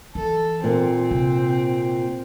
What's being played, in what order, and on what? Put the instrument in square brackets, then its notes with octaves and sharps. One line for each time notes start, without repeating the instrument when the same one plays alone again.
[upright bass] E3 [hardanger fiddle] A4
[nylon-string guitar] A#2 [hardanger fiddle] C4
[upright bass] C3